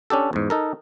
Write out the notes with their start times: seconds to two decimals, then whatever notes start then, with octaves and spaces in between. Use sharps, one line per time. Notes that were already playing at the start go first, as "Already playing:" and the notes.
0.10 C#4 D4 G4 A4
0.33 E2 G#2
0.50 D#4 A4 A#4